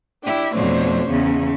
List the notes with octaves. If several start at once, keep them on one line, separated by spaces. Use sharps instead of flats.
D4 E4 G4 G5
F2 B2 A3 D4 C5 C#5
E2 C#3 B3